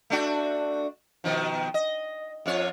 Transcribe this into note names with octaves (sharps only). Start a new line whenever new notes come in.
A3 D4 F#4
B2 D#3 F3
D#5
F2 F4 C#5